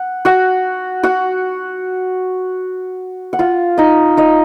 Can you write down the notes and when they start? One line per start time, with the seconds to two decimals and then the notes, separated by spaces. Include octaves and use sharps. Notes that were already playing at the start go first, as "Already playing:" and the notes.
Already playing: F#5
0.25 F#4 F#5
1.03 F#4 F#5
3.33 F#5
3.39 F4 F5
3.78 D#4 D#5
4.17 D#4 D#5